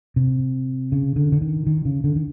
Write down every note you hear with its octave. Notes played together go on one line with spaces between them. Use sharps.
C3
C#3
D3
D3
D#3
D#3
C#3
D3
D#3